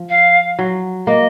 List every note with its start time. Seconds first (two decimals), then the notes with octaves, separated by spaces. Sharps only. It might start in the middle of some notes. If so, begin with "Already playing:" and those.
Already playing: F3
0.10 F5
0.59 F#3
1.07 A#3 D#5